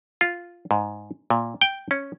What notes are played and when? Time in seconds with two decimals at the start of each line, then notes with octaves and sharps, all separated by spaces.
0.21 F4
0.71 G#2
1.30 A#2
1.61 G5
1.91 C#4